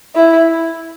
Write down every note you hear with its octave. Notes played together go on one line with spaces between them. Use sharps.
E4